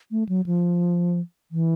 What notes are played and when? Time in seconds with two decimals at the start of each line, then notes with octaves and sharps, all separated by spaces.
0.11 A3
0.29 F#3
0.46 F3
1.51 E3